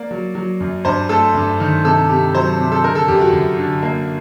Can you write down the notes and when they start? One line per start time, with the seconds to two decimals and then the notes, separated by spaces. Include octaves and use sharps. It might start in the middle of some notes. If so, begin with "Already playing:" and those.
Already playing: A#3 D5
0.11 F#3
0.35 F#3
0.60 F#2
0.85 G2 C5
1.09 A3 A4
1.35 G2
1.60 D#3
1.84 C3 A4
2.09 C3 G4
2.33 F#3 C5
2.58 C3
2.72 A4
2.84 D3 A#4
2.95 A4
3.08 F#2 G4
3.21 F#4
3.32 F#2
3.58 D3
3.83 A#3